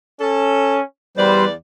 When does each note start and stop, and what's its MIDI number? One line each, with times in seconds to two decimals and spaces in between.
0.21 0.81 61
0.21 0.79 69
1.17 1.53 40
1.17 1.45 55
1.17 1.49 71
1.17 1.45 72
1.17 1.53 74